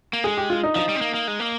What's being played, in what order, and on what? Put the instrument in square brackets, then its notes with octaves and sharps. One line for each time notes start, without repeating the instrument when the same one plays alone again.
[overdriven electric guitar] A#3
[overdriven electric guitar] G#3 [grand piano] G#4
[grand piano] G4
F4
D#4
[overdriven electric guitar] F3 [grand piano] D#4
[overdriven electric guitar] G3
C4
A#3
A#3
G#3
A#3